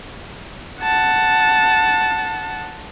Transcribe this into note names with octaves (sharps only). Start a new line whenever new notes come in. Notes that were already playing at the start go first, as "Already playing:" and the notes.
F#5 A5